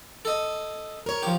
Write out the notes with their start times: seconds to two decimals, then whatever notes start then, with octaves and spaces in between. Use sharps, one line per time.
0.25 A4 D#5
1.06 A#4 C#5
1.23 F3 G4